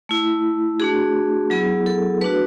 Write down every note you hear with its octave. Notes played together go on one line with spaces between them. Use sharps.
A3 E4
A3 D4 F#4 G#4
F#3 B3 E4 G#4
A4
A3 D4 F#4 B4